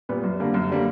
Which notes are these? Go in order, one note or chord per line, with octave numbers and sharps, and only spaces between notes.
A#2 G3 B3
F#2
D3 G3 A#3
F#2
D3 G3 A#3